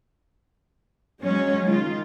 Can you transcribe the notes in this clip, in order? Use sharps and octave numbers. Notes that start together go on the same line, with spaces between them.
F#3 G#3 C#4
D#3 G#3 F4